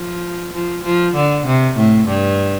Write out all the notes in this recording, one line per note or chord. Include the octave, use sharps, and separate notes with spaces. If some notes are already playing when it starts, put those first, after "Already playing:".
Already playing: F3
F3
F3
D3
C3
A2
G2